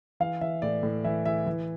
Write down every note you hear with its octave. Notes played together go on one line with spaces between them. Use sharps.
E3 F5
E3 E5
A2 D5
A2
E3 E5
E3 E5
E3